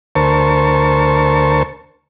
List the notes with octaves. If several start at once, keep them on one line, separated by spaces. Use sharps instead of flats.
D2 A#4 C5 A5 C#6